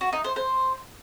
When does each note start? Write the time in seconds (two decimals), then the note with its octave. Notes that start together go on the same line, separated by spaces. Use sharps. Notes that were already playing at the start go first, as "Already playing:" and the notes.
0.01 F#4
0.13 D#4
0.24 C5
0.36 C5